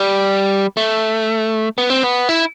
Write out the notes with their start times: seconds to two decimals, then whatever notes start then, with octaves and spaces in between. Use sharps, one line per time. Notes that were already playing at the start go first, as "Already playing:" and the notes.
Already playing: G3
0.77 A3
1.78 B3
1.90 C4
2.03 B3
2.29 E4